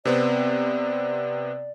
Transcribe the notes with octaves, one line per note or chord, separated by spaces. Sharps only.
C3 B3 C4 D5